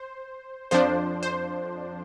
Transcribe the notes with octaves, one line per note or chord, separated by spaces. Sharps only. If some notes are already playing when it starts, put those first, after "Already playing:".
Already playing: C5
F2 F3 D4 C5
C5